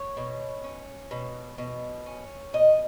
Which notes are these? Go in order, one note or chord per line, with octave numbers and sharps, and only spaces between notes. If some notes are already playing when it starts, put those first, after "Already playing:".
Already playing: C#5
B2
C#4
B2
B2
C#4
B2 D#5